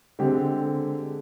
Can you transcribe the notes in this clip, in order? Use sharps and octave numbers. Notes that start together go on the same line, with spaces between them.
D3 G#3 C4 G4